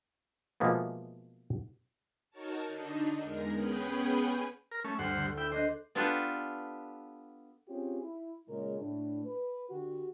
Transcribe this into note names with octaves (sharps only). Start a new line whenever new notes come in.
B2 E3 F3 G#3 A#3 B3
D#4 F#4 A#4 C#5 A5
D3 D4 D#4
E2 G#3 A#4
B3 C#4 G#4 B4 G5 B5
A#4
A3 C#4
D2 G2 C5 F#5 F6
D3
E4 G5
D4 C5 D#5 F#6
B3 D4 F4 G4 A4 B4
C4 C#4 F4 G4 G#4 C#5
E4
A#2 C#3 G#3 A#4 C#5
A2 D4
B4
D3 F#4 G4